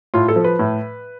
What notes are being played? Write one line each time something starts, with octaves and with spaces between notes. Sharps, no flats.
A2 F4
A4
F3
B4
A2